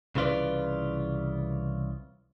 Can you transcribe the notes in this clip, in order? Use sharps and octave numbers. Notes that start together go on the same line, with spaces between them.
C2 C#3 E3 F4 B4 D5